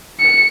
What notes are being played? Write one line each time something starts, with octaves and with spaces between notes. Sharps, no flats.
C#7